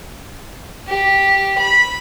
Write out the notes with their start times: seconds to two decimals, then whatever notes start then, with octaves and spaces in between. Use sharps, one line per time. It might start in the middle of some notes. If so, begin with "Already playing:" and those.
0.88 G4
1.58 B5